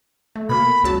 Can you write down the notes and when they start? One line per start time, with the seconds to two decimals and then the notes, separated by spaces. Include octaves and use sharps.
0.36 A3
0.49 B2 A#3 B5
0.83 C#2 F#3 A5